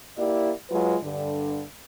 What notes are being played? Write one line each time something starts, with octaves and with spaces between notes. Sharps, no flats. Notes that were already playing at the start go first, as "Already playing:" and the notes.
A#3 E4 G4 D5
F#3 G#3 F4 B4
G2 D3